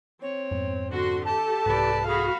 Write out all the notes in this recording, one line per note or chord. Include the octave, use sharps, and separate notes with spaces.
C4 C#5
F2 G#2 B3
D3 F#4 C6
G4 A4 A5
C2 G#2 B4 D5
F#4 G#4 F5 B5